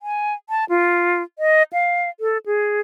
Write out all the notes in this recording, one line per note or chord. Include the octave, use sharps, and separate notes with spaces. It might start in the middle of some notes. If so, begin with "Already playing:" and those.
G#5
A5
F4
D#5
F5
A4
G#4